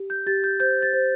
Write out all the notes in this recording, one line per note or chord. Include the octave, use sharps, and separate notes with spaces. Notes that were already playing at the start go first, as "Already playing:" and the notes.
Already playing: G4
G6
G4 A6
G6
C5 G6
A6
C5